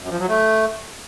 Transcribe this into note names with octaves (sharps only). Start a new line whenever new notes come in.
F#2
F3
F#3
A3